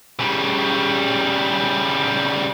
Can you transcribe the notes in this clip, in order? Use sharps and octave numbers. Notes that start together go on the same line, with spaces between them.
C#3 G3